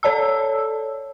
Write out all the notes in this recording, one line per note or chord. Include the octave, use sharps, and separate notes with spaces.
A4 C#5 D5 A5 E6